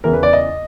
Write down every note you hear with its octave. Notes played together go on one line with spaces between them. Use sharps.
E2 C#3 E3 A#4
B4
D5
D#5